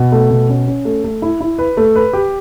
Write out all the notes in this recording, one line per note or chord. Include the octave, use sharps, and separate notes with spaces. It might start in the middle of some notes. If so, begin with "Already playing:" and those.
Already playing: B2
A3
B2
C#4
C#4
A3
A3
E4
E4
B4
A3
B4
G4